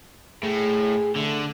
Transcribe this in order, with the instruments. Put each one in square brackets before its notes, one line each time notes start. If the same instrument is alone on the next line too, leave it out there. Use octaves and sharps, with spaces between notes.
[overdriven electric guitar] A2 [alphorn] G#4
[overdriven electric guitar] D3 [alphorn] A3